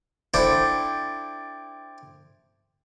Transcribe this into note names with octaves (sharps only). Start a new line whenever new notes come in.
C4 D4 E4 A4 F#5 G5